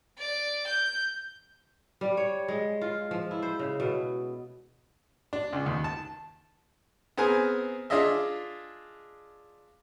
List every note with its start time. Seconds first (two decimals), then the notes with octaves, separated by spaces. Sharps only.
0.18 D5
0.67 G6
2.01 G3
2.17 C#5
2.48 G#3
2.81 F4
3.11 F3
3.31 E4
3.42 C5
3.59 C#3
3.80 B2
5.33 D4
5.53 C#2
5.66 D#2
5.84 A5
7.17 B3 C4 G#4 A#4 G#5
7.90 D4 F4 G#4 D#5 E5